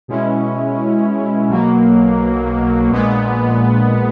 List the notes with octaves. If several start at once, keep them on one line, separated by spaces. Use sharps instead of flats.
B2 G#3 C#4 E4
B1 B2 F#3 A#3
A#1 A#2 G#3 B3